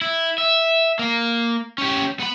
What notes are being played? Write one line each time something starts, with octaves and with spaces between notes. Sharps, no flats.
E4
E5
A#3
C#4 G4
B3 B5